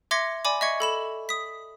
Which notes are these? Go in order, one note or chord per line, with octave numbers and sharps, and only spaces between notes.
E5 C6 D6 G#6 A#6 C#7
D5 G#5 B5 D6
D#5 E5 C#6 G#6 C#7
A4 B5 E7
D#6 B6